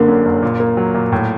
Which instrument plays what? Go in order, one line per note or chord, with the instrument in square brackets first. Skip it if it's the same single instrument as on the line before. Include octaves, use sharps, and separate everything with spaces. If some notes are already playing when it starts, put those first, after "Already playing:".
Already playing: [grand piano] F#1 D3 [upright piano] A#3
[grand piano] F#2
F#1
A#2
A#3
F#3
A#2
A2